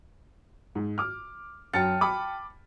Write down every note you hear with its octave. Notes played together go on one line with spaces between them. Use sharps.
G#2
D6 F6
F#2 G5 A5 F6 A6 C#7
B5 D6